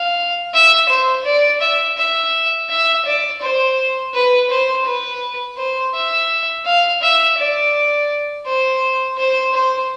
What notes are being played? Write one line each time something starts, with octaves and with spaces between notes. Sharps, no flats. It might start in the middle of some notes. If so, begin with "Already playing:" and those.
Already playing: F5
E5
C5
D5
E5
E5
E5
D5
C5
B4
C5
B4
C5
E5
F5
E5
D5
C5
C5
C5